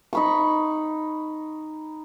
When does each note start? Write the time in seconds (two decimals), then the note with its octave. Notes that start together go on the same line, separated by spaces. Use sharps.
0.13 D#4 B5 C#6